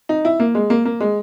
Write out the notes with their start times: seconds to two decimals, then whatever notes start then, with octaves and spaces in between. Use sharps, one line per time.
0.09 D#4
0.25 E4
0.40 A#3
0.55 G#3
0.70 A#3
0.85 A#3
1.00 G#3